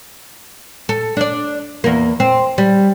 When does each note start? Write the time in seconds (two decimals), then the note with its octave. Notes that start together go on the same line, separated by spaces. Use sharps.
0.89 A4
1.17 D4 D5
1.84 E2 A#3
2.20 C4
2.58 G3